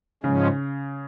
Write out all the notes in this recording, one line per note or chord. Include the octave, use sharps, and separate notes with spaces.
G#2 C#3 F3 G#3 C#4